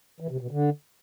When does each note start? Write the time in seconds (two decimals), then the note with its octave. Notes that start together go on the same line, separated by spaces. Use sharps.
0.20 E3
0.31 C3
0.41 B2
0.51 D3